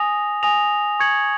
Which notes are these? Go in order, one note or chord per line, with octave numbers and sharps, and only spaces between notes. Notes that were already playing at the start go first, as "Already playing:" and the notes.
Already playing: G#5 D#6 A#6 F7
G#5 D#6 A#6 F7
C#6 G#6 C#7 F#7